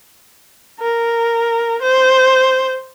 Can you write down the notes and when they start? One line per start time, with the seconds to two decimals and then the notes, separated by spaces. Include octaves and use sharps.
0.80 A#4
1.82 C5